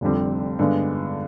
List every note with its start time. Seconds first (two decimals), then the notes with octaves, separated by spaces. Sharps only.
0.01 F1 F2 D3 G3 C4
0.59 G2 D3 G#3 B3